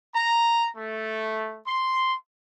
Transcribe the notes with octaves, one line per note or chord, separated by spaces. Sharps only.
A#5
A3
C6